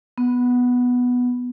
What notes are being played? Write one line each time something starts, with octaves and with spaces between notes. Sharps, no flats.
B3